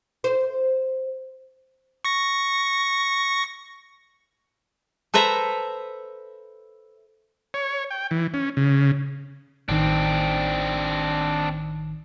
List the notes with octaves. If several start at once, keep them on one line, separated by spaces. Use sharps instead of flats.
C5
C#6 A#6
A4 B4 C5 E5 A#5
C#5
G5
E3
C#4
C#3
A1 D#3 C4 D4